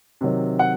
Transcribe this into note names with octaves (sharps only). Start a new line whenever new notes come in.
C3 D#3 F#3
F#5